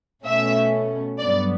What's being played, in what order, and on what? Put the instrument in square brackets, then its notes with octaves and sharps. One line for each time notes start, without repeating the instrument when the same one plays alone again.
[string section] B2 A3 C#4 E5
G2 F#3 B3 D5